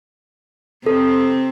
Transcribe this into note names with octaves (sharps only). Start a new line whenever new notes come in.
C3 C4 A4